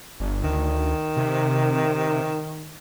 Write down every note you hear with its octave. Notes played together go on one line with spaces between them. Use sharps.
G1
D2 D#3
C3